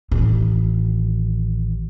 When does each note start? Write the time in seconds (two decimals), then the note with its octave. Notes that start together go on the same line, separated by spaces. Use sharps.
0.11 A1 D#3